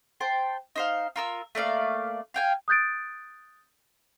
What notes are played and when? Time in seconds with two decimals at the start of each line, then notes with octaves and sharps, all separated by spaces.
0.20 C5 G5 A5
0.76 D#4 C5 F5
1.16 F4 A#4 E6
1.55 A3 A#3 D5 F5
2.34 F5 G5 G#5
2.68 D#6 F#6 G6 A6 D7